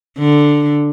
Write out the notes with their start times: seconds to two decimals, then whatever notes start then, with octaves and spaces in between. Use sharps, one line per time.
0.19 D3